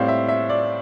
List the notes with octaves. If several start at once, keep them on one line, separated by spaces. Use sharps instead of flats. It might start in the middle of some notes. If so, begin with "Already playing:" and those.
Already playing: A2 G3 C4 F5
E5
E5
D5